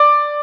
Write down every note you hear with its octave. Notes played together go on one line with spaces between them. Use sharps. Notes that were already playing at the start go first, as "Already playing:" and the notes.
Already playing: D5